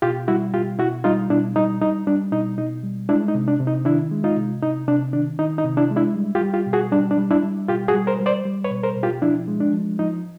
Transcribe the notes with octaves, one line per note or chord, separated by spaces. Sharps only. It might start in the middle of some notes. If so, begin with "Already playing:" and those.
B2 F4 G4
G3 E4 F#4
B2 F4 G4
B2 E4 F#4
G3 D#4 F4
B2 D4 E4
G3 D#4
G3 D#4
G3 D4
B2 D#4
B2 D#4
G3
G#3 D4 E4
D#4
C3
D4
C3
D#4
D#3 D4 E4
G#3
D#4 F4
C3
C3 D#4
C3 D4
D#3 D4
D#3 D#4
D#4
C3
D4 E4
G#3
D4 E4
G3
F4 G4
G3
F4 G4
B2
F#4 G#4
G3 D4
D4
G3
D4 E4
G3
B2 F4 G4
F#4 G#4
G3
A#4 C5
G3
C5 D5
G3
B4 C#5
B2
A#4 C5
B2
F4 G4
F3 D4 E4
G#3
D4
F3
F3 D#4